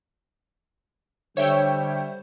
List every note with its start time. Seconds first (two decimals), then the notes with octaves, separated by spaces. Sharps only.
1.37 D3 G3 C5 C#5 E5 G5